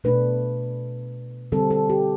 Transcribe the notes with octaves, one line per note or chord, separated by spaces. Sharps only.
B2 A3 D4 B4
D3 G3 C4 A4
A4
G4